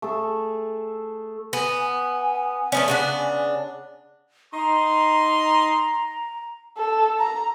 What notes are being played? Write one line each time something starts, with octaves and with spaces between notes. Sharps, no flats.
A3 G#4 A4
B3 G#5
A3 B3 C#4
C#3 B3 D4
D#4 A#5 C6
A4
A#5